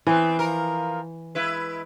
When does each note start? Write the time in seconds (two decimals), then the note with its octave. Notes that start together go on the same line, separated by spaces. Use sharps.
0.07 E3 B3 C4
0.39 F3 A#4
1.35 G#3 E4 B4